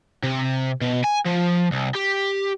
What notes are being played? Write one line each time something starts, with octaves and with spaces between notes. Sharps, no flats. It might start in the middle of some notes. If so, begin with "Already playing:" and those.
C3
B2
G#5
F3
C2
G4